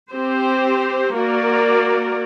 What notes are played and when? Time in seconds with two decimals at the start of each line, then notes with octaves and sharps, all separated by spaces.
0.12 C4 G4 C5
1.16 A#3 F#4 A#4 D5